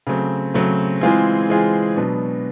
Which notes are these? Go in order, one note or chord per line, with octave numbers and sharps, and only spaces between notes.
C#3 F#3 A3 C4
C#3 F#3 A3 C4
E3 G#3 C4 F4 G#4
E3 G#3 C4 F4 G#4
B2 F#3 B3 D4